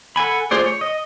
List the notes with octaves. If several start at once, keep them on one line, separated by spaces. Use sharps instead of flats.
A4 F#5 G#5 B5
A3 F4 G#4 C5 D5
C#5
D#5